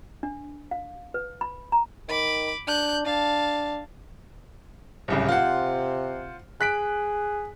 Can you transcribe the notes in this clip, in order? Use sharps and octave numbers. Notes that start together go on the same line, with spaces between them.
D4
F5
B4
B5
A#5
D#3 B5 D6
D4 F#6 G6
D4 F5 A5
D1 C2 C#3
C3 F4 C5 F#5
G#4 F#6 B6 D7